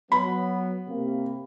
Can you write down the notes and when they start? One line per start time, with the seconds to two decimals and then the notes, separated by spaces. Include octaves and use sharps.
0.12 F#3 B3 B5
0.88 C3 A#3 C4